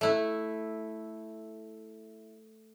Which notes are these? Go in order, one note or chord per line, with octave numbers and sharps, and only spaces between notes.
A3 E4